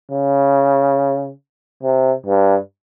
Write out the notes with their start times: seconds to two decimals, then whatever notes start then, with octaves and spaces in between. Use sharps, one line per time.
0.12 C#3
1.83 C3
2.26 G2